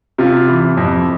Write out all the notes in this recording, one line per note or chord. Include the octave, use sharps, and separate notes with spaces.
C3 F4
E3
F2